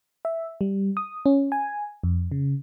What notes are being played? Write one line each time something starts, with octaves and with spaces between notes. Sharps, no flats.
E5
G3
D#6
C#4
G#5
F2
C#3